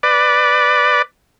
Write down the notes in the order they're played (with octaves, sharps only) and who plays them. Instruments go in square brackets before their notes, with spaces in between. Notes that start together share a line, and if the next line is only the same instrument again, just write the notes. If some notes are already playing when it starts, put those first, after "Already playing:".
[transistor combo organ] B4 D5